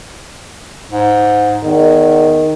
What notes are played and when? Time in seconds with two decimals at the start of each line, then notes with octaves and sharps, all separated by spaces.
0.91 G#2
1.64 E2 D#3